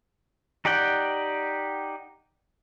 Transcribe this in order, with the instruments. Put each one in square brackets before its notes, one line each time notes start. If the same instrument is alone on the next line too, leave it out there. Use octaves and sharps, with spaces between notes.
[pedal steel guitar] D#4 G4 D5 F#5 G5